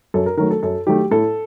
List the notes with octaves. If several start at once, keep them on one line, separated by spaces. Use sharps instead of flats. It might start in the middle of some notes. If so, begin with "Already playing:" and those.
F#2 A4
A#4
D#3 F#3 A3 A#4
A4
F#2 A4
D#3 F#3 A3 G4
A2 A4